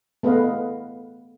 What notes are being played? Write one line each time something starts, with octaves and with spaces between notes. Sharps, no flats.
A3 B3 G#4 B4 D#5 F5